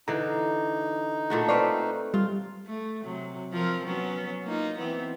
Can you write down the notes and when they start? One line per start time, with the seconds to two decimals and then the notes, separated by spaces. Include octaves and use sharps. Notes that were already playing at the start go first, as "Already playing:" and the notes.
0.08 D3 E3 D#4 A#5
1.30 A#2 A3 F#4
1.49 C4 B4 D5 F5 C#6
2.14 G3 F4
2.66 A3
3.01 C3 F#3
3.52 F3 C4 A#4
3.86 F#3 B3 C#4
4.45 A#3 D#4 F4
4.78 E3 B3 C4